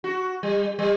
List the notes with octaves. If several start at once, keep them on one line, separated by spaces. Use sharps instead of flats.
F#4
G3
G3